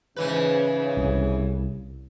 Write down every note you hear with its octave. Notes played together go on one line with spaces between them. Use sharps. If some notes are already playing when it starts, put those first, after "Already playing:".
G#2 C#3 E3 B4
C2